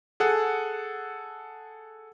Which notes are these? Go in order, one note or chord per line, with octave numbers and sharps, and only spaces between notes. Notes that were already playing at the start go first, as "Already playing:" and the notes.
G#4 A4 F#5